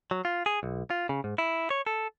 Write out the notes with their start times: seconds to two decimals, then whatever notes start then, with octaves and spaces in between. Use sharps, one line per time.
0.11 F#3
0.25 F4
0.46 G#4
0.63 B1
0.90 F4
1.09 C#3
1.24 G#2
1.38 E4
1.70 C#5
1.87 A4